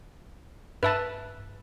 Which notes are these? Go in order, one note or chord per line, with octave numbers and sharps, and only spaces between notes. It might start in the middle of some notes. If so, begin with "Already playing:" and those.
G2 B4 E5 A5